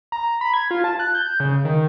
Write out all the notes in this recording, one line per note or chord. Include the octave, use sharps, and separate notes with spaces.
A#5
B5
G#6
F4
A5
F#6
G6
C#3
D#3